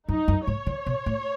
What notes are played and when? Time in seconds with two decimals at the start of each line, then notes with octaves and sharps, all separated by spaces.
0.08 F#2 D#4
0.28 F#2
0.47 G#2 C#5
0.67 D#3
0.86 B2
1.06 A2